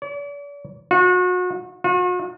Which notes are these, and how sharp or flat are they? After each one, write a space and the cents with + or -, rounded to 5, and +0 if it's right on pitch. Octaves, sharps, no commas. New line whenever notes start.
D5 -45
F#4 -35
F#4 -45